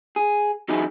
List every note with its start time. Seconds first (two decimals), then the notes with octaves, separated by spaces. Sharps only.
0.16 G#4
0.68 E3 F#3 C#4 D#4 E4 G#4